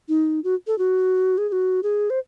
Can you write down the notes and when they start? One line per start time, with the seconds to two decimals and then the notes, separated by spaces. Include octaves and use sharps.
0.09 D#4
0.44 F#4
0.67 A4
0.78 F#4
1.38 G#4
1.49 G#4
1.52 F#4
1.83 G#4
2.10 C5